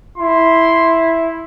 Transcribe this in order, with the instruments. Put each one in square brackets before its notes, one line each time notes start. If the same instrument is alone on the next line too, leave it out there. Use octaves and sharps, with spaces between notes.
[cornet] E4 [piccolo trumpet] C6